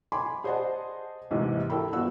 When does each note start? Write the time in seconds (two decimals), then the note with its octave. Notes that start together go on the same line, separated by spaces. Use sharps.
0.12 G#5 B5 C6 D6
0.44 G#4 C5 D5 D#5 F#5 A5
1.31 D#2 G#2 C3 E3
1.70 E4 A4 A#4 G5 B5
1.93 G1 F3 F#4 E6